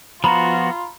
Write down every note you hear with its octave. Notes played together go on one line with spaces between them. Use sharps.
F3 B3 F4 F#4 A#5 B5